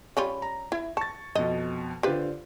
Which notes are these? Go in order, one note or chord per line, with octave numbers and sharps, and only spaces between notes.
G3 C#4 F4 B5
A#5
E4 G#6
A5 C#6 A6
F2 B2 D#5
D3 F4 G4 B4 C5